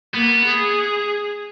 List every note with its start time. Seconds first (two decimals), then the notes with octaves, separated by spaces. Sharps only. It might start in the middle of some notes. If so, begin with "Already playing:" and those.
0.14 A#3 B3
0.45 G#4